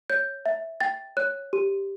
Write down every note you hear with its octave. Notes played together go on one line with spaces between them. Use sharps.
C#5 G6
E5
G5 A6
C#5 F#6
G4